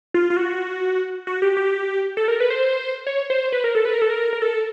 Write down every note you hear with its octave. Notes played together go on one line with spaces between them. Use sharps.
F4
F4
F#4
F#4
G4
G4
A4
A#4
B4
C5
C#5
C5
B4
A#4
A4
B4
A#4
A4
A#4
A#4
A4